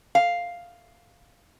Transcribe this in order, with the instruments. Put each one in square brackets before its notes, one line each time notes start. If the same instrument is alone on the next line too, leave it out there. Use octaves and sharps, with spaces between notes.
[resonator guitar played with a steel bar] F5